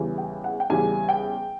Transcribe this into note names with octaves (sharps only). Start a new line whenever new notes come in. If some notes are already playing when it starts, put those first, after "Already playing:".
Already playing: E2 C#3 E3 G3
G5
F#5
G5
E2 C#3 E3 G3 G#5
G5